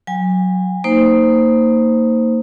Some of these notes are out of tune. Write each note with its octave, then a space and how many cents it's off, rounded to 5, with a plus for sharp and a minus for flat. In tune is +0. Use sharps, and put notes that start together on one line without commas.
F#3 +0 G#5 -30
A#3 -20 D#4 +0 C5 +0